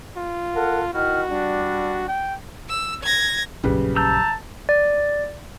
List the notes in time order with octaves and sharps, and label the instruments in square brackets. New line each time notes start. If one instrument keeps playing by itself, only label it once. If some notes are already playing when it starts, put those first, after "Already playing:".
[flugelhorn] F4
[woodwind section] A4 A#4 F#5
[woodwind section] D#3 E4 F6 [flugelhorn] F#4
[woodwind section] G3 D4
[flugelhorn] G5
[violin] E6
G#6 A#6
[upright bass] A#1 F#2 [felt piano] C#3 G3 B4
[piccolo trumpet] A5 [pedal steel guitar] A#5 E6 G6
[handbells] D5